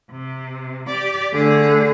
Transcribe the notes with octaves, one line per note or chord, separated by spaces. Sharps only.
C3
G4 D5
D3 A3 G#4